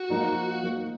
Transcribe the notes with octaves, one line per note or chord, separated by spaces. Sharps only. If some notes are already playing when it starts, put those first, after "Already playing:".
Already playing: F#4
F3 A#3 D#4 A#4
F3 A#3 D#4 A#4